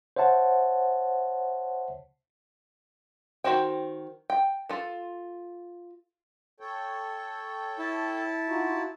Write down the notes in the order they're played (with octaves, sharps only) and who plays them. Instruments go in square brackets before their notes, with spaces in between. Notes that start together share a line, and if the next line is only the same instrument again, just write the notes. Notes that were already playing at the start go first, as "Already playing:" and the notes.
[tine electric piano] C5 C#5 E5 F#5 A5
[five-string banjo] D#3 E3 F#4 C5 G5
G5
F4 A4
[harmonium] A4 C#5 G5
[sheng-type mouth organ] E4 A5
[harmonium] D#4 F4 F#4